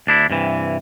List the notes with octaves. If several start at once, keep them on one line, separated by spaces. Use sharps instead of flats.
D2 D4 E4
G2 C3 E3